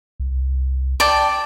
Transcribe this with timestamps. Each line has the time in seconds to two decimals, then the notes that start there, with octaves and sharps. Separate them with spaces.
0.20 C2
1.00 D5 G5 A5